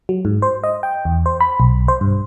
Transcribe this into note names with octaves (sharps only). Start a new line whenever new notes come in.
F#3
G#2
C5
D#5
G5
E2
C5
B5
B1
C5
G2